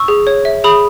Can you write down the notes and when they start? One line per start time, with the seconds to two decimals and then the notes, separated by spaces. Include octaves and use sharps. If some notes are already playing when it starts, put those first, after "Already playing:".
Already playing: C#6 E6
0.08 G#4
0.27 C#5
0.45 E5
0.64 G#4 B5 D#6